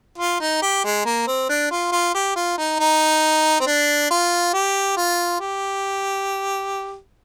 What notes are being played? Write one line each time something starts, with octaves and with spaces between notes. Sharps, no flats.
F4
D#4
G4
G#3
A#3
C4
D4
F4
F4
G4
F4
D#4
D#4
C4
D4
F4
G4
F4
G4